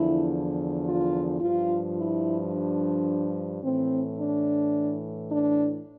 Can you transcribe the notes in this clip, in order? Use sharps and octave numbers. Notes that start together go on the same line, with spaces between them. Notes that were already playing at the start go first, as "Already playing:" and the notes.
Already playing: E2 D3 F3 E4
F4
G2 F3 F4
E4
D4
A2 E3 C4
D4
D4